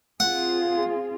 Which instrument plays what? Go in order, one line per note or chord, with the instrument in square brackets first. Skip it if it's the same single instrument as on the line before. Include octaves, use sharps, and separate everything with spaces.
[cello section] C4 F4 G#4 [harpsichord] F#5